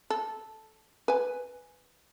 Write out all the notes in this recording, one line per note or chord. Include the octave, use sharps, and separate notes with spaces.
A4
B4 G#5